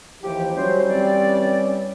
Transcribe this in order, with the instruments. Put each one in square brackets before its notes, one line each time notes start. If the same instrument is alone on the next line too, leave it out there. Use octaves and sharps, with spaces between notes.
[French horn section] D#2 E3 F3 [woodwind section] G4
[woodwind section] F#3 C5 [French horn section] G3 C#4
[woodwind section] E3 C4 D5